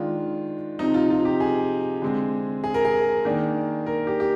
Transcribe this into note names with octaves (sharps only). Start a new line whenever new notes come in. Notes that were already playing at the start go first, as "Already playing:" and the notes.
Already playing: D#3 G#3 D4 F4
C3 F3 C4 D#4
F4
F4
G4
G#4
D3 G#3 C4
G#4
A#4
G#4
D#3 A#3 D4
A#4
G4
G4